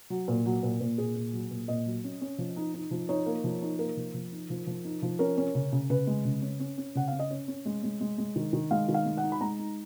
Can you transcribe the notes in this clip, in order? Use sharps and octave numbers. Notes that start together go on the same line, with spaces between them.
F#3
A#2
F#3
A#2
A#2
A#2 G#4
A#2
F#3
A#2
A#2 D#5
F#3
C#4
C#4
F3
D#4
D#4
F3
D#4 C#5
A#3
F3
D#4
A#3 A#4
F3
F3
D#4
F3
F3
D#4
F3
C#4 A#4
C#4
C#3
C#3
C#3 B4
G#3
C#3
C#4
C#4
C#4
C#3 F#5
C#4 F5
D#5
C#4 C#5
C#4
G#3
G#3
G#3
G#3
D#3
D#3
G#3 F5
D#3
F5
G#3
F#5
D#4
B5
G#3 A#5
D#4